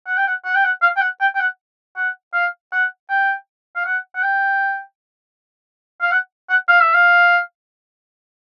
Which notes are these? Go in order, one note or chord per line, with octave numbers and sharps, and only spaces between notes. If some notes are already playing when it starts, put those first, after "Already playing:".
F#5
G5
F#5
F#5
G5
F#5
F5
G5
F#5
G5
G5
F#5
F#5
F5
F#5
G5
F5
F#5
F#5
G5
F5
F#5
F#5
F5
E5
F5